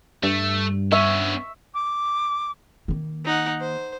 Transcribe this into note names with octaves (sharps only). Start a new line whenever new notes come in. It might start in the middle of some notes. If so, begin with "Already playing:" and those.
G2 A3
B3 C#4 E5 C#6
D6
D#3 A#3
D#4 F#5
C5